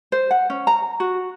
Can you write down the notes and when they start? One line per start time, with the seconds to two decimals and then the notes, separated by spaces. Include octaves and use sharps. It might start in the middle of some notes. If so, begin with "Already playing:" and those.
0.12 C5
0.31 F#5
0.50 C#4
0.67 A#5
1.00 F#4